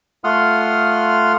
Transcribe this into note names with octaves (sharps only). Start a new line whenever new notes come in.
A3 F4 F#5 C6 D#6 F6